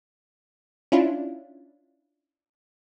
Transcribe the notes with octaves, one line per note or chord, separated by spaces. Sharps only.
C#4 D4 E4 F4